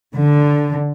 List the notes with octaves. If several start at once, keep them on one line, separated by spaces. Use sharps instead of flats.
D3